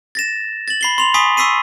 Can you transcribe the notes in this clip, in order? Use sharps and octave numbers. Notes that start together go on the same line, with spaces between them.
A6 A#6 E7
A6 F#7
B5 C7 G7
C6 F7 F#7
G#5 B5 C#6 D#6 B6 C7
C#6 E6 B6 C7 D#7